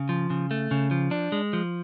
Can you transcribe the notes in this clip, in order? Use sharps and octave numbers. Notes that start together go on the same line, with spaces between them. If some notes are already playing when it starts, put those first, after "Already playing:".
Already playing: C#3
F3
C#3
A3
C#3
F3
D4
G#3
F3